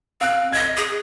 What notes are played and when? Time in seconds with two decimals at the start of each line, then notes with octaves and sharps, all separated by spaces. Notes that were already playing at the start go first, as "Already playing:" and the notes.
0.21 C4 F5 F#6
0.52 D#5 G#6 A#6
0.76 G#4